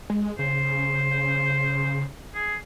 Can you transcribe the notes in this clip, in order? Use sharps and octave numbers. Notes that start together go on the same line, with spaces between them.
G#3
C#3 C5
G#4